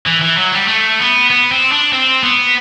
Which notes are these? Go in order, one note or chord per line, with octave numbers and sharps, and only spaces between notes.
E3
E3
F#3
G3
A3
B3
B3
C4
D4
C4
B3